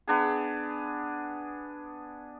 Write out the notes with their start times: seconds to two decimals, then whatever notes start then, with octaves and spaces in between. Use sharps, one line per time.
0.08 B3 D4 G#4